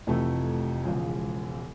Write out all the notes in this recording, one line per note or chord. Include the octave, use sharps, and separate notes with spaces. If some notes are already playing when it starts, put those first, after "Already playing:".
F1 F2 C3 E3 A3
E1 E2 C#3 F3 G#3